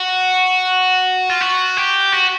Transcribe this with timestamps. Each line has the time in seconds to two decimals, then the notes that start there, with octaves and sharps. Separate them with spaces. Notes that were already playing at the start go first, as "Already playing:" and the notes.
Already playing: F#4
1.30 F4
1.41 F#4
1.77 G4
2.13 F#4